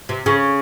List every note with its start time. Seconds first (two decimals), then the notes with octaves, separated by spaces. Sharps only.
0.09 C3
0.26 C#3